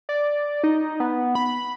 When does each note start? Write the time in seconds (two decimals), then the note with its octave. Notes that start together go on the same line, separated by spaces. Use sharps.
0.09 D5
0.64 D#4
1.00 B3
1.35 B5